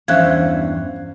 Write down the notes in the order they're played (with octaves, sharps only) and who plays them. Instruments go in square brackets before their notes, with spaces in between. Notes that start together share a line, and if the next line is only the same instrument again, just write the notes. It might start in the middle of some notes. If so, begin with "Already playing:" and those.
[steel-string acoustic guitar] E2 G2 [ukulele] C#4 C5 E5 [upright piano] F5 [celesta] F#6 G#6